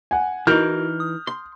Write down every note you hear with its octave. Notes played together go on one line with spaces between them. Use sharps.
F#5 G#5
E3 D#4 E4 F#4 A#4 F6 G6
D#6
C6